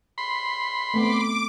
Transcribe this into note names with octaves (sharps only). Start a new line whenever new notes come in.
B5 C6
A3 B3 C4 D6